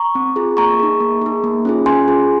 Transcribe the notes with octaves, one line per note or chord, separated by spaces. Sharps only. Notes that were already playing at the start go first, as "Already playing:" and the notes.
Already playing: A#5 C#6
C4
F4 G#4
A#3 A#5 C#6
D#4 G#4
A#3
D#4 G#4
A#3
C#4 F4 G#4
C#4 G#5 C6
F4 G#4